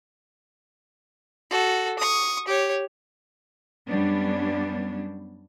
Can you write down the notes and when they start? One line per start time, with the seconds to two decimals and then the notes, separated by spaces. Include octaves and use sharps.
1.50 F#4 A4
1.98 C#6 D#6
2.48 G4 C#5
3.87 F#2 G3 B3 C#4 D4